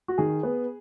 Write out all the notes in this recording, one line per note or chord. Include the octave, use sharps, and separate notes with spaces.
F#4
D#3 G#4
B3